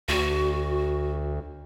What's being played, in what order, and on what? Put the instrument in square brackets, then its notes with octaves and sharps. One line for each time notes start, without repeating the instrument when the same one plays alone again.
[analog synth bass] D2 [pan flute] F#4